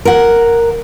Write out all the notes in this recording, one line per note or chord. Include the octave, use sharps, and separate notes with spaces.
A#4 F#5